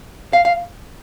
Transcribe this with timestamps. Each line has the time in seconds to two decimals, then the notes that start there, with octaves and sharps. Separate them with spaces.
0.33 F5
0.45 F5